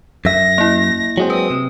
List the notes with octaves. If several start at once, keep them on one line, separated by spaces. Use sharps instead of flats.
F#2 E5 A#6
A#3 E4
F#3 G#3 C4
B4 D#6
C3